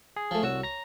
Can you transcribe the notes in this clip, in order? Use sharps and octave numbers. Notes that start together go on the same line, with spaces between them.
G#4
F3 A3
C2 F#4 C#5 E6
A#5 A#6